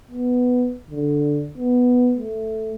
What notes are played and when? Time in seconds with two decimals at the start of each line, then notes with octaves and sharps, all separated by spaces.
0.11 B3
0.90 D3
1.58 B3
2.18 A3